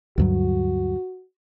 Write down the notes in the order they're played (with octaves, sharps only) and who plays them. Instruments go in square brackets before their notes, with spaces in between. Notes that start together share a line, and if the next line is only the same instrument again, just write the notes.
[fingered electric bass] D2 G2 F#3 [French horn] F#4